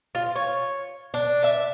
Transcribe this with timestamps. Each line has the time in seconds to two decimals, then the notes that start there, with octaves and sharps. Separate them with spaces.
0.15 F4
0.35 C#5
1.14 D4
1.44 E5